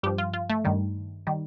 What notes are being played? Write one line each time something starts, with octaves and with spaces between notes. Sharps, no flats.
G2 F3 G4
F4
F4
A3
G2 D#3 G3
D#3 G3